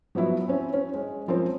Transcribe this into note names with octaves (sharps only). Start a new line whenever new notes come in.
F3 F#3 B3 E4 F#4
C4 C#4
C#4
G#3
F3 C4 C#4 A#4 C5